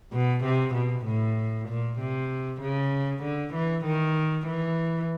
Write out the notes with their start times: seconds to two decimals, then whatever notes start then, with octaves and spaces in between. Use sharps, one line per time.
0.12 B2
0.44 C3
0.74 B2
1.06 A2
1.68 A#2
1.99 C3
2.61 C#3
3.23 D3
3.54 E3
3.85 D#3
4.47 E3